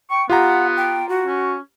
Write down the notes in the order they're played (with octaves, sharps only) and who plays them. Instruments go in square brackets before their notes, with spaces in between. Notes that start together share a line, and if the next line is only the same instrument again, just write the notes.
[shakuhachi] G5 [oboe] C#6
[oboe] B3 [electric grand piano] F4 G4 A#5 [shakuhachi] F#5
[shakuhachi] G5
F#4
[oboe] C#4